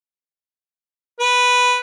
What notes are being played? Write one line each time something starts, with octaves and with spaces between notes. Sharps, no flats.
B4